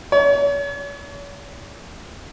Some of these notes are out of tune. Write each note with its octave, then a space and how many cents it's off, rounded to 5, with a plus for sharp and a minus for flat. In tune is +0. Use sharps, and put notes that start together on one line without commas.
C#5 +40